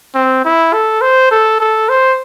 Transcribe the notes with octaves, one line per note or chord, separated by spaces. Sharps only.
C4
E4
A4
C5
A4
A4
C5